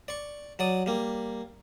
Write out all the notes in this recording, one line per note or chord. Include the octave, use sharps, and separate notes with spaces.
D5 C#6
F#3 D5 D#6
G3 A#3